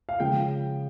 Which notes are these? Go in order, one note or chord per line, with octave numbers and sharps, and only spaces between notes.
F5
C#3 F3 G#3 G5